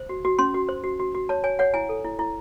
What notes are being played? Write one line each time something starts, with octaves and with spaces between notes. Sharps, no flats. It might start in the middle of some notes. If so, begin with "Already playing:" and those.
Already playing: C5
F#4
F#4
C#4 C6
F#4
C5
F#4
F#4
F#4
C#5 A5
C#5 G#5
C#5 F#5
E4 G#5
A4
E4
E4